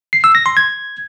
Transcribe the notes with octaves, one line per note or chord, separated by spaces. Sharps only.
C7
E6
A#6
C6
G#6